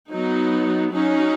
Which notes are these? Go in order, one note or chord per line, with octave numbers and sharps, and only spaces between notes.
F#3 B3 D#4
F#3 C#4 D#4